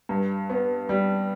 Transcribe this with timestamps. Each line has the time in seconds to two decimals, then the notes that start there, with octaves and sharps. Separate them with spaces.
0.09 G2
0.50 B3
0.89 G3